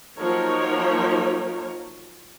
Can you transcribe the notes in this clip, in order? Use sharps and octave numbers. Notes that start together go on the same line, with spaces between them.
F3 F#3 A#3 D#4 A#4 C#5